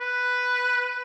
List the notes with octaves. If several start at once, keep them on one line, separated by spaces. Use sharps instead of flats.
B4